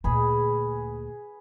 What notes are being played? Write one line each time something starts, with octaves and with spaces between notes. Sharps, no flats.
D2 A#2 G#4 B4